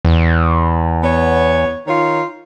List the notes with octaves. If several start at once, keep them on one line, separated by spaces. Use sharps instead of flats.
E2
B3 C#5
D#3 F4 C#5